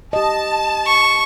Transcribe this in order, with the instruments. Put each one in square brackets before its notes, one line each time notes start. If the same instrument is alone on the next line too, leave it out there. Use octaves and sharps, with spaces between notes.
[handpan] G4 D#5 [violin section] A5
[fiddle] C#6